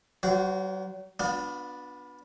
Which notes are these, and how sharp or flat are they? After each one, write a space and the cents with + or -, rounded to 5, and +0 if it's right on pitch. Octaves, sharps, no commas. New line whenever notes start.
F#3 +45 F#4 -15 C5 -30
B3 -10 D4 -5 F4 +40